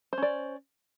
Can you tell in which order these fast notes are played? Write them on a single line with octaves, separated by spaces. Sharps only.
C5 C#4 D5